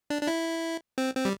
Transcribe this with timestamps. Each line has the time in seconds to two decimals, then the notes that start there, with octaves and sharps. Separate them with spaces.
0.10 D4
0.23 D4
0.27 E4
0.98 C4
1.16 C4
1.25 G3